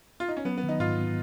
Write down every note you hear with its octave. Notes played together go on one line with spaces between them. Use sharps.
F4
D#4
C#4
F#3 B3
B3
D#3
D#4
G#2 F4
B3